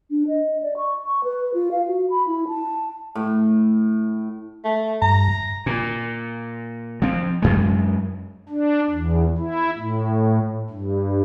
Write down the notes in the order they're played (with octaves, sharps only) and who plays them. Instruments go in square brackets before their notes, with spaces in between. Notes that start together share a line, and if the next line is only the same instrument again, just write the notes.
[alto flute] D4
D#5
D5
C#6
C#6
B4
F4
F5
F#4
B5
E4
A5
[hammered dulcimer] A2
[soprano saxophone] A3
[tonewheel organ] G2 [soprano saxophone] A#5
[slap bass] A#2
F3 C4
F#2 G#3
[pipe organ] D4
E2
E4
A2
G2